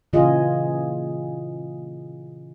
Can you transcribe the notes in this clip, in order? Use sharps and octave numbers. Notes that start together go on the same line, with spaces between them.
A#2 C#3 E3 F4 G#4 D#5